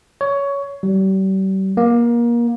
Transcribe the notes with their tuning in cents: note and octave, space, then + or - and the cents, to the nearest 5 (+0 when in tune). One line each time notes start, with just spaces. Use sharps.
C#5 +15
G3 -40
A#3 +25